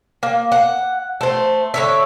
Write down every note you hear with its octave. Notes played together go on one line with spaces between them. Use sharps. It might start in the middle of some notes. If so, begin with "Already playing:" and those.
A#3
F#5
A3 C5
D3 C#5 E5